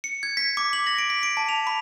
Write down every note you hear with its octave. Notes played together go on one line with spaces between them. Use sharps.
C#7
G#6
B6
D6
F#7
A#6
D7
B6
D7
A5
F7
B5